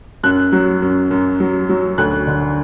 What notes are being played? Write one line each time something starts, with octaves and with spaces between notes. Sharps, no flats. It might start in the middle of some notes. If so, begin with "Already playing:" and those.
F#2 F#6
F#3
F#2
F#2
F#3
F#3
D2 F#6
D3